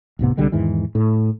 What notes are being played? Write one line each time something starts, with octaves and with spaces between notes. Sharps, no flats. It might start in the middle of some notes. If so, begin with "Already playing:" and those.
D1 G#1 C3 B3
C2 D3 G3 G#3
E2 G#2 D#3 E3
A2